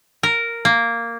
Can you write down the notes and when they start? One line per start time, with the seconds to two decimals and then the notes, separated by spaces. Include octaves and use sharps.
0.23 A#4
0.65 A#3